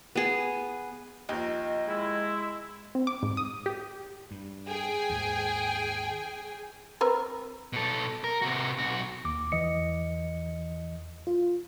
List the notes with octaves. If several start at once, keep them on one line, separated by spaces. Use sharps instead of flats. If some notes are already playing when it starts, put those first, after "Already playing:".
B3 G#4
D#2 F3 D#4 D#5
G#3 E4
C4
D6
G#2
D#6
G4
G2
G#4 G5 G#5
D#2 G#2
C4 A#4 B4
B2 A4
A#4
C3 F#4
B1 F#4
D#2 D6
E2 E3 D#5 C#7
F4